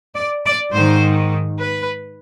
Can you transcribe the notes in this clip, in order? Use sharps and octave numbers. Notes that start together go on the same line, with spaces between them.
D5
D5
G#2 D#3 C5
B4